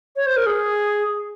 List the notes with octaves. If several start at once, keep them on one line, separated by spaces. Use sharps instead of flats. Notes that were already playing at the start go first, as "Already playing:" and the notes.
C#5
C5
A#4
G#4